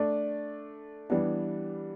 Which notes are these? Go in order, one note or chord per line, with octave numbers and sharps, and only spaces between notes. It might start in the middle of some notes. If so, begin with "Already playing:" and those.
Already playing: A3 D4 A4 D5
E3 G3 B3 D4